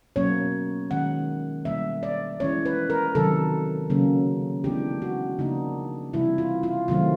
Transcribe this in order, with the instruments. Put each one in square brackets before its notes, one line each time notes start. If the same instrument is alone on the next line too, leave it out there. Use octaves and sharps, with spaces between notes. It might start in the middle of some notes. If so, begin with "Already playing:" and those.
[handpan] B2 F#3 A#3 C#4 C#5
D#3 G#3 C#4 F#5
B2 G3 A#3 E5
D5
E3 G#3 C#4 C#5
B4
A#4
C3 D#3 F#3 A4
C#3 F#3 A#3 C#4
E3 G#3 B3 D4 G4
F#4
C#3 F3 A#3 D4 D#4
C3 E3 G3 E4
F4
F4
C3 D#3 F#3 A3 C4 F4